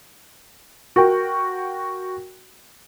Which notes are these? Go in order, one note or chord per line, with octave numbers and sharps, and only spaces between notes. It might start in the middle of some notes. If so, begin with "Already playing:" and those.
F#4 A#4 G5